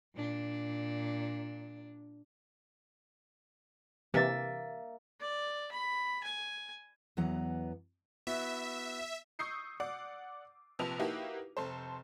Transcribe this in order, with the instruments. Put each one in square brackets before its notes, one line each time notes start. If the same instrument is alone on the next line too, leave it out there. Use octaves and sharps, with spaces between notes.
[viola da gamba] A#2 D4
[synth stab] C3 E3 [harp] A#3 E5 A6
[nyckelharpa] D5
B5
G#5
[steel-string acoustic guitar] E2 E3 F#3 B3 F#5 A#5
[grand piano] B3 E4 F#4 [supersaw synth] E5
[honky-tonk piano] C#6 D#6 E6 G6 C7 C#7
D5 F#5 D6
A#1 C3 F3 B4 A5 F7
A#3 D#4 E4 F#4 G4 B4
F1 A4 C5